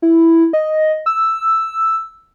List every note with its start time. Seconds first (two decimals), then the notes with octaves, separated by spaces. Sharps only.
0.02 E4
0.53 D#5
1.06 E6